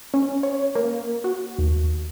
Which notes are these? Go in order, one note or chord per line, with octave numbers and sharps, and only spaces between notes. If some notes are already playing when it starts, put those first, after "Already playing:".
C#4
C#5
A#3
F#4
D#2